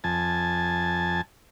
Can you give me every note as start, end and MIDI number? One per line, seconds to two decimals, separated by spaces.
0.04 1.21 41
0.04 1.21 80
0.04 1.21 81